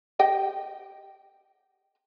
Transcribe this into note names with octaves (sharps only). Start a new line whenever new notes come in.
G4 D#5 G5